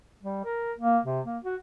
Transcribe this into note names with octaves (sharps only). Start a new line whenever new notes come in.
G3
A#4
A#3
C3
A#3
F#4